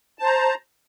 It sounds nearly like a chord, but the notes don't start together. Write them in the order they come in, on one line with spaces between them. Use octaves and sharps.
A5 C5 A#5